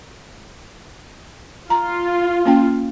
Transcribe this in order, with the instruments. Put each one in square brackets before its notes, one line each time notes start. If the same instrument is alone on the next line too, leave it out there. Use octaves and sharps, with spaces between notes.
[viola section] F4 [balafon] A#5
[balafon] A#3 C#4 G5